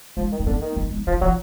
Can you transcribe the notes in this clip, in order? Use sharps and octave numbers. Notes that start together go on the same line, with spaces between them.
F3 G#3
D#3
G#3
D3 A#3
D#3
G#3
G#3
F3 F#3
F3 F#3